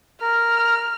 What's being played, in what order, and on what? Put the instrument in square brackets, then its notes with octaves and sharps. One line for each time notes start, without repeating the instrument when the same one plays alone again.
[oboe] A#4 [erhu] F6